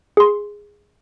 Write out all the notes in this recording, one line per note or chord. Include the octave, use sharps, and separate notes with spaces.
G#4 C6